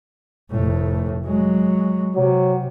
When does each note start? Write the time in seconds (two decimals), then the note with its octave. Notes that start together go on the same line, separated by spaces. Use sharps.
0.50 F1 A2
1.24 F#3 G#3
2.16 C3 F#3